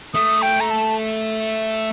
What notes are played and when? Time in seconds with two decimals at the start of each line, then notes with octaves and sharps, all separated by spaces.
0.14 A3 D#6
0.42 G5
0.60 A#5
0.70 A5